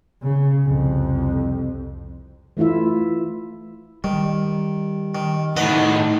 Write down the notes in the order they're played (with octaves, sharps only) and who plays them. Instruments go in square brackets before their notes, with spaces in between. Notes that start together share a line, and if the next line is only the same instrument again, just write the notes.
[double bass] C#3
C2 F2
[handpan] E3 A3 E4 F4 E5
[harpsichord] D#3 [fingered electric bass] G3
[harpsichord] D#3
[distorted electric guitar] A2 D#3 [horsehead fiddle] D#4 [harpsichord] B4 D#5 F#5